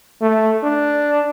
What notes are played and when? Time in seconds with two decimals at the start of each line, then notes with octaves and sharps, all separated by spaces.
0.22 A3
0.64 D4